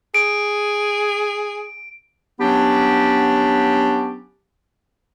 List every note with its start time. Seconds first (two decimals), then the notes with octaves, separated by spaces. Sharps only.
0.14 G#4 D7
2.40 F#3 B3 C#4 D4 G4